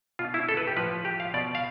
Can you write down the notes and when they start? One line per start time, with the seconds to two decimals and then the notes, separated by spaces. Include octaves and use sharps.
0.19 B2 F4
0.34 E4
0.49 A4
0.57 B4
0.67 G4
0.76 A2 F3 B4
1.05 G4
1.20 F5
1.34 B2 D5
1.55 F5